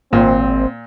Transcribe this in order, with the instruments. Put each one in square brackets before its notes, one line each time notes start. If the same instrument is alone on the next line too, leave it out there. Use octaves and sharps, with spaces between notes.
[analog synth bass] G#1 [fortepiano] A#2 [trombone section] C4